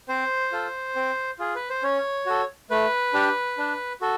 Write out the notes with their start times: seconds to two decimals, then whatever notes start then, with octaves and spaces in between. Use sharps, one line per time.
0.08 C4 C5
0.52 F4 A4
0.96 C4
1.39 F4 G#4
1.55 B4
1.70 C5
1.83 C#4 C#5
2.26 F#4 A4
2.70 A3 B4
3.13 D4 G4
3.58 D4
4.01 F#4 A4